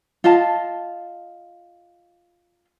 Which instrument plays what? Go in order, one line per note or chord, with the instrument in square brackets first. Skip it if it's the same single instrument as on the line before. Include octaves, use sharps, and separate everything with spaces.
[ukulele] F4 D#5 F5 A5